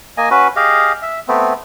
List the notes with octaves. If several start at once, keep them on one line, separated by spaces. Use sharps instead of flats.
A#3 D#5 G#5
C#4 F#4 B4
G4 G#4 D#5 F5
E5
A3 B3 C4